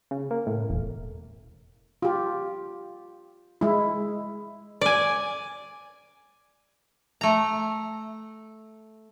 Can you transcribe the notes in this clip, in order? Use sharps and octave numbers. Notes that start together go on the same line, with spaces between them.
C#3
A#3
A2
E1
F4 G4
G#3 E4
D5 G#5
A3 A#5